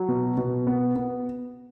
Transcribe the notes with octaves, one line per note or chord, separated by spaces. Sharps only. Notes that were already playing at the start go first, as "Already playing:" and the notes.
Already playing: F#3
B2
B2
B3
B3